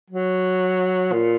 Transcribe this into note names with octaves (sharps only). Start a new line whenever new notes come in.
F#3
A#2